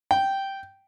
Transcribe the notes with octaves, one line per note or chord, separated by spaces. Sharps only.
G5